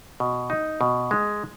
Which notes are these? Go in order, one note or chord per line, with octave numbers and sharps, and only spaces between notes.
B2
D#4
B2
G#3